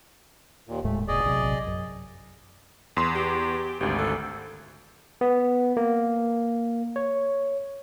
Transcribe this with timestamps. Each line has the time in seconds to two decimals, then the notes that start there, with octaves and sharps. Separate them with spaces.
0.68 D#2 A#2
0.84 D#1 A2 G#3 A3
1.08 F1 B2 G#4 D5 D#5
1.24 A#1 C3 F#3
1.67 F#2
2.97 E2 C6
3.15 G4
3.80 G#1 D2 G4
3.98 A4
5.21 B3
5.77 A#3
6.96 C#5